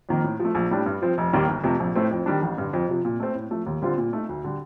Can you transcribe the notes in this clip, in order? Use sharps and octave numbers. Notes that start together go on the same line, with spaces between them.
F2 D#3 A#3
A2
F3
A3
A#1
A2 G3 D4
G2
F3 C4
F1
D#2 D#3 G3 A#3
G1
F2 C3 F3 A3
A#1
A2 A3 C4
F2
D#3 G3 D4
A1
G2 D3
F2
C3 F3
A#2
A3 C4
A2
F3 A3
D#2
D3 G3 C4 F4
A#2
A3 D#4
D2
D3 G3